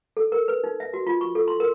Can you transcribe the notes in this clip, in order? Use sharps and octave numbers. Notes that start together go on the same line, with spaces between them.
A4
A#4
B4
D#4
E5
F#4
F4
C#6
A4
C6
A#4